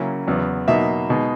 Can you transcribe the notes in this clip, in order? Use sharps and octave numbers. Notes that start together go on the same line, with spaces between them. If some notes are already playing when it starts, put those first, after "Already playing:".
Already playing: C#3 F#3 A#3 C#4 E4
E2 C#3 F#3 B3
B2 F#3 A#3 D#4 E5
B2 G#3 D#4